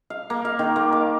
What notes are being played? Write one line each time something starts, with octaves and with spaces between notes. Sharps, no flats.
F5
A#3
F5
D#3
A#3
D6